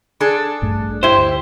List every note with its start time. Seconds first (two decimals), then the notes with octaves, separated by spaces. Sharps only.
0.20 D4 G#4 A4
0.62 A1 G2 A3
1.03 E4 G4 C5
1.17 D2